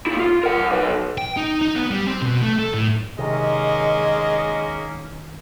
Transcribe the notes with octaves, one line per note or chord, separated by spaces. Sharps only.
A#3 E4
F4
A#4 F#5
B1 B4
G5
D#4
D#4
B3
G3
C4
B2
A3
A4
A2
C3 D#3 G#3 A#3 C#4 D#5